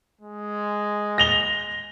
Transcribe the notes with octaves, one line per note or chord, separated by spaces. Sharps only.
G#3
A#6 F7 G7